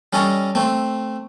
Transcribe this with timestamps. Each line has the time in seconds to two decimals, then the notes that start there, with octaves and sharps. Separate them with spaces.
0.13 G3 C#4 A4 D#5
0.55 A3 C4